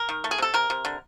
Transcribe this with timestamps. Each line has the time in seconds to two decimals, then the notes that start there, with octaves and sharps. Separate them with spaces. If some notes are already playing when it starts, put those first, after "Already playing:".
Already playing: A#4
0.09 D#3
0.24 A3
0.31 G#4
0.38 C3 A4
0.54 C3 A#4
0.70 C3
0.85 D3